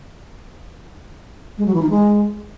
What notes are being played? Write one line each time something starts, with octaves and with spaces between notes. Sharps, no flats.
G#3
F#3
E3
D#4
G#3